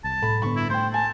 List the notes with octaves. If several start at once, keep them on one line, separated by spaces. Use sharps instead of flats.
C2 A5
A2 B5
G2 D3 B3 B5 C#6
E4
A3 C5 G5 C6
G#5 A5